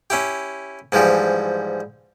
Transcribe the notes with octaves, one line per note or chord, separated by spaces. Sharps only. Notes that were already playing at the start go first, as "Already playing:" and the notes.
C#4 E4 G4
G#2 E3 F3 G3